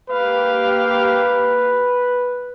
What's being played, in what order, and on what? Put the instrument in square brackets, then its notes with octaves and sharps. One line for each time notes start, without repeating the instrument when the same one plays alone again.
[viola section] A#3 G4 F5 [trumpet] B4